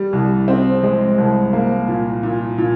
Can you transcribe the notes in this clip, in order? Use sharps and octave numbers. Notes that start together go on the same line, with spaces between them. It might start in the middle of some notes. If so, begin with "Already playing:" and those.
Already playing: G3
C2
C4
G#3
C2
A#3
A#2
A#2
A#2